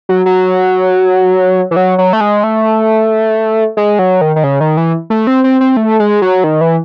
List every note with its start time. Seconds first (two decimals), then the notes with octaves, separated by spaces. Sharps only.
0.09 F#3
0.26 F#3
1.71 E3
1.76 F#3
1.98 F#3
2.13 A3
2.21 G#3
2.44 A3
3.77 G#3
3.99 F#3
4.21 D#3
4.36 D#3
4.44 C#3
4.60 D#3
4.77 E3
5.10 A3
5.27 C4
5.44 C4
5.61 C4
5.77 A3
6.00 G#3
6.22 F#3
6.44 D#3
6.61 E3